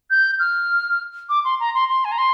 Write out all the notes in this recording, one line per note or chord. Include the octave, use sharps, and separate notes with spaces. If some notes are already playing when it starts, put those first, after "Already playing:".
G6
F6
D6
C6
A#5
C6
C6
G#5
A#5
C6